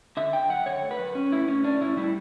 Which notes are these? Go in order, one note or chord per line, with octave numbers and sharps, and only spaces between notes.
D3 E5
D3 G5
F#2 F#5
D3 C#5
A3
B4
F#2
C#4
A2 E4
A2 C#4
C#4 D4
A2 E4
G3 E4